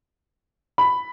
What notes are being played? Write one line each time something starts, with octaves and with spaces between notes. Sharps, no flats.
B5